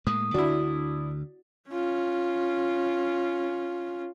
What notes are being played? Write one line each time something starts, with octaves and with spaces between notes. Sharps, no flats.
A2 G#3 A#3 D#6
D2 D3 D4 E4 F#4
C#4 F4